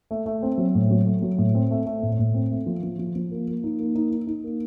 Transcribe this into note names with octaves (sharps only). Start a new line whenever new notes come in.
A3
A3
C4
F#3
A2
F#3
A3
F#3
A2
C4
A3
A3
A2
A2
C4
A3
F3
F3
F3
F3
A#3
A#3
D#4
A#3
D#4
D#4
D#4
A#3